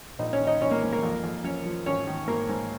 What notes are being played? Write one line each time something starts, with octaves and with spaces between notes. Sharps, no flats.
A#1 D#4
C#4 C#5
D#3
D#4 D#5
A#1 C#4 C#5
A#3 A#4
G#2
A#3 A#4
F2
F2
F3 C#4 C#5
F3
G#1 C#4 C#5
D#3
G#1 A#3 A#4
G#2